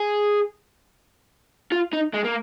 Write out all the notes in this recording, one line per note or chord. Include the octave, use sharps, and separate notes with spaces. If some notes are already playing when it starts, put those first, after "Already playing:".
Already playing: G#4
F4
D#4
G#3
A#3